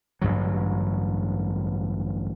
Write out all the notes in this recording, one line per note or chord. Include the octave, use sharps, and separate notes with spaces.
A1 G2 D3 F#3